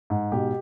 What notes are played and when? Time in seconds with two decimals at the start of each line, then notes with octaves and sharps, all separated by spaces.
0.10 G#2
0.32 B2 G4